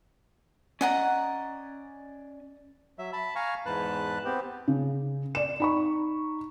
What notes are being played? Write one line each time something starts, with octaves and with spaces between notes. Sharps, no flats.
C#4 D5 D#5 F#5 G#5 A#5
F#3 E5
A5 B5
F5 G#5 A#5 C#6
E2 G#2 B4 A5 F#6
B3 C4 G4
C#3
D5 E7
D#4 B5 C#6